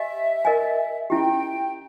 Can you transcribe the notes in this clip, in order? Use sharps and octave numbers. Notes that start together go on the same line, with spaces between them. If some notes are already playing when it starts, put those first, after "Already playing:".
Already playing: G4 D#5 E5 G#5
A#4 D#5 G#5
C#4 E4 G4 G5